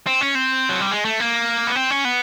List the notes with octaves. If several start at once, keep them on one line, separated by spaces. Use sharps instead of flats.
C4
C#4
C4
F#3
G3
G#3
A3
A#3
B3
C4
C#4
B3